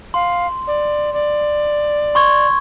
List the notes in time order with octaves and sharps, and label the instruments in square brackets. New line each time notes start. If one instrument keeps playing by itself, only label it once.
[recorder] F5 [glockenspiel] C6
[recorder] D5
D5
[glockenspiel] C6 C#6 G#6